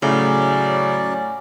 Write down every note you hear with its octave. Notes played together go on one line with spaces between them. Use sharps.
A2 C#3 F#3 C#4 D5